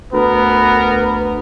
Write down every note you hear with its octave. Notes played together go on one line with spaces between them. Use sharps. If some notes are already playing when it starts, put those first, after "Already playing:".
D2 B3 A#4 B4